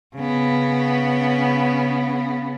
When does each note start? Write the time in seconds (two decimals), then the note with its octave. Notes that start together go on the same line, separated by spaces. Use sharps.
0.16 C#3 B3